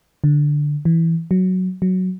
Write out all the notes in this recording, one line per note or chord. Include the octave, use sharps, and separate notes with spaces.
D3
E3
F#3
F#3